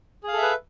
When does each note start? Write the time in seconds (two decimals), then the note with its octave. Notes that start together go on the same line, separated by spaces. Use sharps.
0.23 G#4
0.28 F5
0.33 A4
0.38 E5
0.42 B4